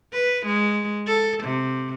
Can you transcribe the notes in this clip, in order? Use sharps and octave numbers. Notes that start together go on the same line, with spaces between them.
B4
G#3
A4
C3